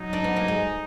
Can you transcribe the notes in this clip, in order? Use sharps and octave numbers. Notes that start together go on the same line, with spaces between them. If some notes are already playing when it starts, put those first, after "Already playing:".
Already playing: F#3 D#4
D4
B3
A#3
G#3